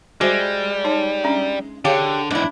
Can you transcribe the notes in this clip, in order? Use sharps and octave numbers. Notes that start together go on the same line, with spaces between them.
G3 G#3 F#4 C5 E5
D#4 C#5 A5
C#4 D4 E5
D3 G4 G#4 C#5 F5
E2 G#2 D4 E4